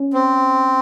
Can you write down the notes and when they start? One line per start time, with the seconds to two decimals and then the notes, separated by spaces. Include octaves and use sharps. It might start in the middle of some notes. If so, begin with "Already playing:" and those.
Already playing: C#4
0.13 C4